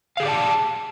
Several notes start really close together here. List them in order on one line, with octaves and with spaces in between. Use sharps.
F5 G#4 G4 D5 A5